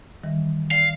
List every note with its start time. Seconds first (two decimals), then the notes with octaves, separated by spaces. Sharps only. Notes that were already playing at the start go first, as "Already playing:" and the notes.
0.23 D#3 E3 G3
0.71 D5 F5